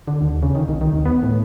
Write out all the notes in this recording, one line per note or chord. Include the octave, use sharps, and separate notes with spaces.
D3
D#2
C#3
D#3
C2
D#3
D#2
B3
A2